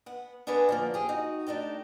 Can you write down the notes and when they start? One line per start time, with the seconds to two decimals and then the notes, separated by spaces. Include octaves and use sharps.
0.06 B3 F#5
0.47 B3 D4 G#4 A#4 B4 D5
0.69 D3 F3 A#3
0.94 G4 G#4
1.09 D#4 F#4
1.47 A3 D4 D#4 G4